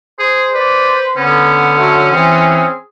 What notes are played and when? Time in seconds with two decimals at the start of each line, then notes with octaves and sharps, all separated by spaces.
0.19 G#4 C5
0.54 B4 D5
1.17 D3 B3 C#4
1.78 F#3 A3
2.12 E3 C4 G#4